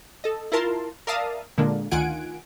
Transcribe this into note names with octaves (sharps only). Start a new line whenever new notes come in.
A4 D#5
E4 F4 A#4 A5 C6
A#4 D5 E5 F5 A5 D#6
A#2 D3 G#3 A#3 D4
D2 D#3 F4 F#5 G#5 D7